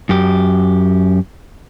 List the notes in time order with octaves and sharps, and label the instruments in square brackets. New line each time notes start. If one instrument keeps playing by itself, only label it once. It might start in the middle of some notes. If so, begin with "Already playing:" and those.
[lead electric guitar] F#2 G4